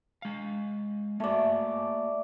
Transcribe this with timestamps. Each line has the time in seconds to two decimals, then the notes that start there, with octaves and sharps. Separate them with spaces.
0.22 G#3 F5
1.20 A3 A#3 F#4 D5